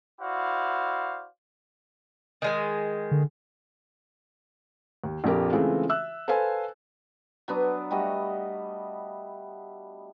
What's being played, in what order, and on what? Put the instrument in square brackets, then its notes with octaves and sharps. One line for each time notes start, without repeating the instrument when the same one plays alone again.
[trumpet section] E4 F#4 C5 D5 F5
[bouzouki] D#3 G#3 G#5
[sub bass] D3
[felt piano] D#2
A#1 F2 G4 A#4
C#3 E3 G#3 A3 C4 F4
E5 E6 F#6
A4 B4 C5 F5 G#5
[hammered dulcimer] F#3 B3 D4
G3 A3 F#4 D#5